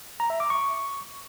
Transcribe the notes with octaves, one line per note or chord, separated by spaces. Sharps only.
A#5
E5
D6
C#6